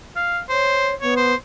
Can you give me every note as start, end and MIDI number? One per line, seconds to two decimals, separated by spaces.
0.16 0.40 77
0.49 0.92 72
0.49 0.95 73
1.01 1.33 59
1.01 1.16 73
1.16 1.35 72